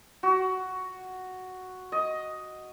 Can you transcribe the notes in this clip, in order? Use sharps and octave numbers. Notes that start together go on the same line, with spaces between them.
F#4
D#5